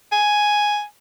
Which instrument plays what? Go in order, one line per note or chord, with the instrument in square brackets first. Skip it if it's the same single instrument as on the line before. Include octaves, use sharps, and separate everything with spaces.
[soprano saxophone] G#5